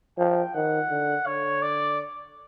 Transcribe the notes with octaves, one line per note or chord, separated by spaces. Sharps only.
F3 G5
D#3 F#5
D3
D3 C#5
D5